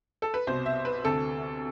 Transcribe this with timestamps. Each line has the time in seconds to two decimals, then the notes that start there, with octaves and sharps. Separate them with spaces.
0.22 A4
0.34 B4
0.47 C2 B2 C5
0.66 E5
0.85 B4
1.04 D2 C3 A4